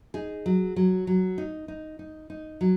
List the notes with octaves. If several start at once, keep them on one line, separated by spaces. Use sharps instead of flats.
D#4 G#4
F#3
F#3
F#3
D#4
D#4
D#4
D#4
F#3